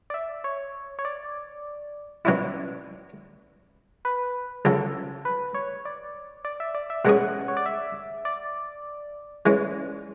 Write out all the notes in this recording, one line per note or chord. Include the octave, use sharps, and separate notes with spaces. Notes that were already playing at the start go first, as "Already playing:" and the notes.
D5
E5
C#5
C#5
D5
B2 F#3 C#4 E4
B4
C#2 C#3 F#3 A4
B4
C#5
D5
D5
E5
D5
E5
B2 G#3 C#4 G#4 F#5
C#5
D5
E5
D5
E3 G#3 C#4